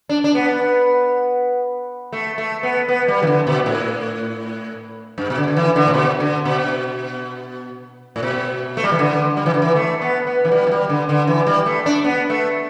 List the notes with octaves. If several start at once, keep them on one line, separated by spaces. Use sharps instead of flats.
D4
D4
B3
A3
A3
B3
B3
G3
E3
D3
B2
A2
G2
B2
D3
D3
E3
D3
A2
B2
D3
B2
A2
B2
A3
G3
E3
D3
G3
E3
D3
E3
A3
B3
B3
E3
G3
E3
G3
D3
D3
E3
G3
A3
D4
B3
A3